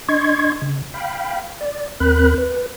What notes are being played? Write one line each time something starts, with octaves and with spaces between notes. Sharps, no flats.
D4 D#5 C6 C#6 G#6
C#3
F5 G5 B5
D5
D#2 C4 A#4 B5 F#6
B4